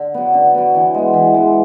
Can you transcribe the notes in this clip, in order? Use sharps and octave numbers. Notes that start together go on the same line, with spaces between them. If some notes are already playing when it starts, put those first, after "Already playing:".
Already playing: D3
F#3 B3
D3
F#3 B3
E3
G#3 B3
E3
G#3 B3